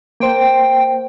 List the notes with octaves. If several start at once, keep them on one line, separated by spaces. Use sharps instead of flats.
A#3 C5 G5